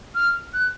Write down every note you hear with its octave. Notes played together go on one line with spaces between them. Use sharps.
F6
F#6